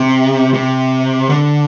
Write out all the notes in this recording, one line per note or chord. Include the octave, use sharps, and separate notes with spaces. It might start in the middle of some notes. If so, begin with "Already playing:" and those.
Already playing: C3
C3
D3